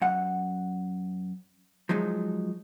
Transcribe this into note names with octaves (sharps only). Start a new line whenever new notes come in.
F#2 F#5
F3 F#3 G#3 D#4